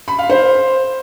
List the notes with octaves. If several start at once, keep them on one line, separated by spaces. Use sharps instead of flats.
B5
F5
C5